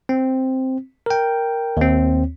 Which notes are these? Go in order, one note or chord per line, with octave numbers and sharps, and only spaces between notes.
C4
A#4 G5
D#2 C4